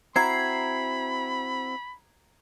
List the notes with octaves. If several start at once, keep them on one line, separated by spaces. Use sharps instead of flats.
C4 E4 F#4 A#5 B5 G#6 C7